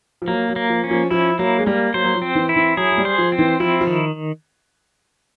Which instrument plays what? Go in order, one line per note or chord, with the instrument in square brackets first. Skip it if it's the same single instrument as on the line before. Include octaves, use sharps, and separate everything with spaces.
[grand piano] F3
[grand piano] F#3 [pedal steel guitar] A#3
[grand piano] F#3
[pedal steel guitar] A#3
[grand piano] F3
[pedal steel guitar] C#4
[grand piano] F3
[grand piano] F3 [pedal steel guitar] E4
[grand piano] F#3 [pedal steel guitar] A#3
[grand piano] G#3
[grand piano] G3 [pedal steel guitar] A#3
[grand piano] F#3 [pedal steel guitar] C5
[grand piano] F#3
F3
[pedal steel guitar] C4
[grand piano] E3
[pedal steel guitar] E4
[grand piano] E3
[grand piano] F#3 [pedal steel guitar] G#4
[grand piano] F#3
G3
[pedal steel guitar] C5
[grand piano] F3
[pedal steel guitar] C4
[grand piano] E3
[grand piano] F3 [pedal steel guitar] E4
[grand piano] F3
[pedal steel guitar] D#3